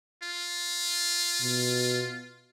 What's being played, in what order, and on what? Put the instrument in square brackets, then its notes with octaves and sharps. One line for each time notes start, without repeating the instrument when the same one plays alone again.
[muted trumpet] F4
[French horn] B2